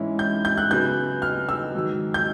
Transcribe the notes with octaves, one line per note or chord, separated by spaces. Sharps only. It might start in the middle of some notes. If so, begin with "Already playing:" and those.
Already playing: G#2 E3 G#3 C#4 E4
G6
G6
F#6
C#3 F#3 B3 G6
F6
E6
G#2 D#3 F#3
G6